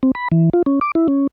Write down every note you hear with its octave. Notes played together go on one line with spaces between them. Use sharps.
C4
B5
E3
F4
C#4
D6
E4
C#4